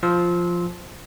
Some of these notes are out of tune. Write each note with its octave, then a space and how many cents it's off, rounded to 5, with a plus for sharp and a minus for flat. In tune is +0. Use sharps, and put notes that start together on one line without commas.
F3 +0 C6 +0 E6 -25